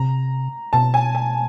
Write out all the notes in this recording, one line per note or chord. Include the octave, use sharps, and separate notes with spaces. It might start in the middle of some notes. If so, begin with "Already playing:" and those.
Already playing: C3 A#5
B2 A5
G#5
G#5